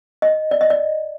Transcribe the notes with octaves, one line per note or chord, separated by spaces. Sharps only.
D#5
D5
D#5
D5